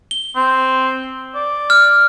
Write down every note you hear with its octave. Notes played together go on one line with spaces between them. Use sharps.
G7
C4
D5
F6